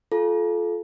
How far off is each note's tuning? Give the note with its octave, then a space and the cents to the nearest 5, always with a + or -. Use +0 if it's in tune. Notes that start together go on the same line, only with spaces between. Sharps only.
F4 +0 A4 -30